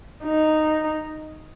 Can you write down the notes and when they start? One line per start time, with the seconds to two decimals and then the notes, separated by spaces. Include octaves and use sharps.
0.24 D#4